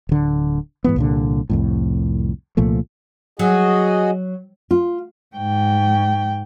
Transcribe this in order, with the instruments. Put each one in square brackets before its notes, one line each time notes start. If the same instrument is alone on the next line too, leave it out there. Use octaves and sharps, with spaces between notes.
[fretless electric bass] D1 D3
G#2 E3 B3
C2 A#2 D3
C2 F2 A2
C2 A#2 F3 A3
[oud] F#3 [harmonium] F#4 G#4 D#5
[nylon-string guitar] F4
[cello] G#2 G5